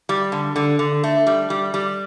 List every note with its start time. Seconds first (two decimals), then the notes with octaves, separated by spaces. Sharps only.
0.09 G3
0.32 D3
0.56 D3
0.79 D3
1.04 A3
1.27 G3
1.50 G3
1.74 G3